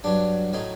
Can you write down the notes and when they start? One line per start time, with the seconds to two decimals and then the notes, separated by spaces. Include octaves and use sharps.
0.04 G2 F#3 D4
0.53 A2 F#3 D#4